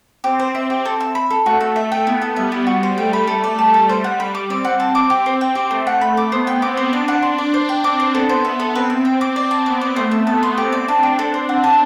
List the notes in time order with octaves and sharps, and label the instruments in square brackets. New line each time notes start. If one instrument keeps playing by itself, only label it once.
[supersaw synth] C4 [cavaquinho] G4
[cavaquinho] C5
[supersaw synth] C4 [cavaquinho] E5
[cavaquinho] G4
A4
E5
B5
A4
[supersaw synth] A3 [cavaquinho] F#4
[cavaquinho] A4
[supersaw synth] A3 [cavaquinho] E5
[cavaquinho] G5
[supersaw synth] B3 [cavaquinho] E4
[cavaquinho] A4
[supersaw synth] G3 [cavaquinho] E5
[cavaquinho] E4
F#4
C5
[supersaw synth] A3 [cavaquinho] G5
[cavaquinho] B5
A4
D5
[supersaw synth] G3 [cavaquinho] A5
[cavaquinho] A4
C5
F#5
B5
D6
[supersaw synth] C4 [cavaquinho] D5
[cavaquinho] F#5
[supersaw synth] C4 [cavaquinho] A5
[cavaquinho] D6
G4
C5
G5
G4
[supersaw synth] A3 [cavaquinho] C5
[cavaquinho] F#5
[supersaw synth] A3 [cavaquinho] B5
[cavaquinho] D6
[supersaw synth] B3 [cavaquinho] C5
[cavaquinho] G5
[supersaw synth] C4 [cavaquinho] D6
[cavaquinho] C5
[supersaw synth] D4 [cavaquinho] D5
[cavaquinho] F#5
C6
D5
C5
G5
[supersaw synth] C4 [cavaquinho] D6
[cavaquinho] C5
[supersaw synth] B3 [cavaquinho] A4
[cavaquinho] C5
E5
A4
[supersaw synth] C4 [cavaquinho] B4
[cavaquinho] E5
G5
D6
D5
A5
[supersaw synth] B3 [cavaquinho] D6
[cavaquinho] D5
[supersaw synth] A3 [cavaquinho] C5
[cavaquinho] E5
[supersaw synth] B3 [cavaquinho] A5
[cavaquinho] C6
[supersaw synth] C4 [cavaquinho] G4
[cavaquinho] D5
[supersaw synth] D4 [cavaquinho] A5
[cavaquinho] G4
A4
C5
[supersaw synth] C4 [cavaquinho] F#5
[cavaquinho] A5